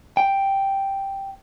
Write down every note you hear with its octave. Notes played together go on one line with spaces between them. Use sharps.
G5